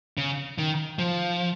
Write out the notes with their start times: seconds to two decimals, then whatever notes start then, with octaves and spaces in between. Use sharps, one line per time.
0.17 C#3
0.58 D#3
0.99 F3